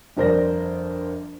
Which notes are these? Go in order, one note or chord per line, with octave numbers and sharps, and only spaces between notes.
G1 F2 A#4 C5 D5 A#6